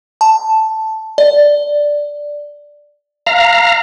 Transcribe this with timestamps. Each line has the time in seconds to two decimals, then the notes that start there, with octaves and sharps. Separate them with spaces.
0.21 A5
1.18 D5
3.27 F5 A#5